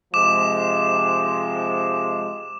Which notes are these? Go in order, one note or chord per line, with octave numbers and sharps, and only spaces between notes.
C3 F3 G#3 D6 E7